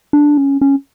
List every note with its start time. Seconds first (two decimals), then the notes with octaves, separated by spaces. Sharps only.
0.13 D4
0.37 C#4
0.61 C#4